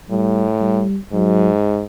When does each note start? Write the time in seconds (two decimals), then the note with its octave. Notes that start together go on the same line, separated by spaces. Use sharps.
0.10 A2 G3
0.61 G3
1.12 G#2 F#3